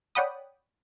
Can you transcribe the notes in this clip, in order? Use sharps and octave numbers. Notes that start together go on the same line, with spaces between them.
C#5 D5 F#5 G5 B5 D#6